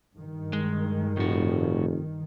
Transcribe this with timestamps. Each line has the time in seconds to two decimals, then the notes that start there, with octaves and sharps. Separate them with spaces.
0.16 G2 D#3
0.53 G#3
1.17 F1 A2 F#4